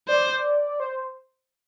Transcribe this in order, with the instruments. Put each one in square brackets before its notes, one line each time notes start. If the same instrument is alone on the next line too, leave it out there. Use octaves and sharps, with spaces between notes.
[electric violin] C5 [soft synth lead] D5
[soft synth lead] C5